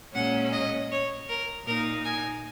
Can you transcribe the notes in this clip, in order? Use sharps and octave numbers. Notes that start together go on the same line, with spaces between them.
A#2 G#3 C#4 F#5
D#5
C#5
A#4
A#2 A#3 D#4 A#4
G#5